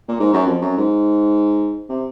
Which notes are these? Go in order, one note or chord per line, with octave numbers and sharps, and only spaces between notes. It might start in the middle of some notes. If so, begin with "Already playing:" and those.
A#2
G#2
F#2
F2
F#2
G#2
C3